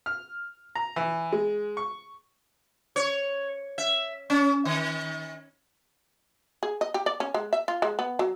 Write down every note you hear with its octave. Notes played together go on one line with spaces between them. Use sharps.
F6
A#5
E3
G#3
C#6
C#5
E5
C#4
D#3
G#4
D#5
G4
D5
C#4
G#3
E5
F4
G#3
B3
F#3